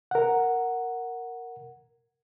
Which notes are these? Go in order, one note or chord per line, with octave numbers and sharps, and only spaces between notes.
A#4 F#5